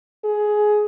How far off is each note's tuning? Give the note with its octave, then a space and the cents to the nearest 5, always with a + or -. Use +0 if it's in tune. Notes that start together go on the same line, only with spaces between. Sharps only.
G#4 +15